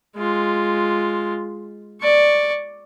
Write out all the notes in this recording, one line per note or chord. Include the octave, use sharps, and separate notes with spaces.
G#3 F4
D5 C#6